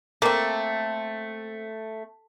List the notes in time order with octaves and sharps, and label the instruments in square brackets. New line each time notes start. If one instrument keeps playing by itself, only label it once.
[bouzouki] A3 [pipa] A#3 C4